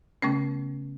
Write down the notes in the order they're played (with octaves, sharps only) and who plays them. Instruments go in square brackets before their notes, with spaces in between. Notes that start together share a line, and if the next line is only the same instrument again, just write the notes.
[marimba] C#3 A3 B3 C#4